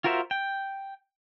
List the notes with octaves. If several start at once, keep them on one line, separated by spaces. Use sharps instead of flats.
F4 F#4 A#4 C5 E5
G5